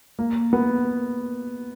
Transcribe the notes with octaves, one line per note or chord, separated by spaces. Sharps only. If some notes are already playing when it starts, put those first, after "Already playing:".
A#3
B3